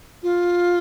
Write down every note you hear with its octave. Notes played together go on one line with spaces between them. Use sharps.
F4